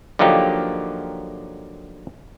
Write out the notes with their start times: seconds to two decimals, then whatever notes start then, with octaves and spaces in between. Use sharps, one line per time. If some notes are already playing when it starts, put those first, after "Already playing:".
0.19 D3 F3 F#3 A#3 D#4 G4